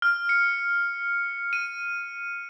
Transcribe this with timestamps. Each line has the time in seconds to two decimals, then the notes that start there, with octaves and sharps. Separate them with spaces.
0.02 F6
0.29 C#7
1.53 D#7